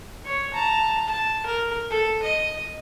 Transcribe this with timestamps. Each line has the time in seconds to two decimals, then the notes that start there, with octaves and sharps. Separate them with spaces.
0.25 C#5
0.54 A5 A#5
1.08 A5
1.46 A#4
1.90 A4
2.23 D#5